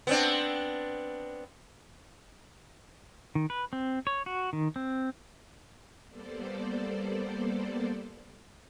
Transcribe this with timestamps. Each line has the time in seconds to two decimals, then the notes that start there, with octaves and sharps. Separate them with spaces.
0.07 B3 C4 D4
3.35 D#3
3.50 B4
3.73 C4
4.07 C#5
4.26 F#4
4.53 D#3
4.76 C4
6.09 G3 A#3 B3 A4 C5 D5